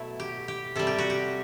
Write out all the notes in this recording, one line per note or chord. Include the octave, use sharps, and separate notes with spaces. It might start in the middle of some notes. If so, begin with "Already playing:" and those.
Already playing: B2 F#3 A3 E4
G4
G4
C3 G3 A4
G4
F#4
G4